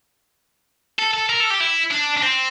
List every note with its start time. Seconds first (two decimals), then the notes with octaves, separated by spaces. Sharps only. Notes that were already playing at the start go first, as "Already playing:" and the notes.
0.99 A4
1.14 A4
1.29 A#4
1.40 A4
1.50 G4
1.60 E4
1.91 D4
2.17 D4
2.22 C4